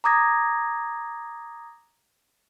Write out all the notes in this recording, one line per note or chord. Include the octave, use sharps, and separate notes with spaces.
A#5 D6 D#6 G#6 A#6